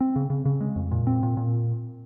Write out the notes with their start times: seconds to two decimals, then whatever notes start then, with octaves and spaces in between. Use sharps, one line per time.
0.01 C4
0.16 C#3
0.30 C#3
0.45 C#3
0.61 G#3
0.76 F2
0.91 A#2
1.07 C4
1.23 A#2
1.37 A#2